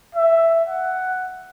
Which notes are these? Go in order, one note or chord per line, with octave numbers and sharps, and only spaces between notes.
E5
F#5